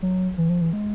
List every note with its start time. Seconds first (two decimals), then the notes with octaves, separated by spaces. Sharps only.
0.02 F#3
0.38 E3
0.49 F3
0.61 E3
0.73 G#3